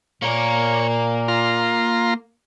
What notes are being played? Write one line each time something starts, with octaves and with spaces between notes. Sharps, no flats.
A#2 A#3 A#4 C#5
F4 A#5 C6